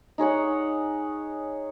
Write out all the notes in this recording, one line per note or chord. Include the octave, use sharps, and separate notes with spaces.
D#4 G#4 C#5 F#5